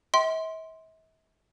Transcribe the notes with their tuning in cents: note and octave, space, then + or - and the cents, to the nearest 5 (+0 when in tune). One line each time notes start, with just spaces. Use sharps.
E5 -45 G5 -30 C6 +0